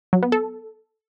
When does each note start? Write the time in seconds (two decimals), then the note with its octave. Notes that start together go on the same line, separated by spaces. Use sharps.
0.13 F#3
0.23 B3
0.32 A4